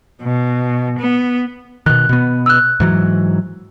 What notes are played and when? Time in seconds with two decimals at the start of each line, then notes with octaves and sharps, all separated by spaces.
0.22 B2
0.99 B3
1.86 B2 D#3 F#6
2.09 B2 B3
2.46 E6 F#6
2.80 G#2 E3 F#3